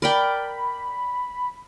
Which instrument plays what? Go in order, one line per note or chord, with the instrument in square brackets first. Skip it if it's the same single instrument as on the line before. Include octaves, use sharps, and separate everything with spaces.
[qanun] A#4 D5 G5 [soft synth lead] B5